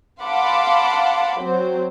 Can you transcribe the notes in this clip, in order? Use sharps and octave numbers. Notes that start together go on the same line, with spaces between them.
F5 F#5 A5 B5 C6 D6
F#3 C4 C5